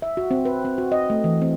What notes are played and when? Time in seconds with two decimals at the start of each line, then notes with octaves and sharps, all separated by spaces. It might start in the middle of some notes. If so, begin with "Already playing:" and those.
0.02 E5
0.17 F#4
0.31 C4
0.45 B4
0.65 C4
0.78 F#4
0.92 D#5
1.10 A3
1.24 E3
1.42 C4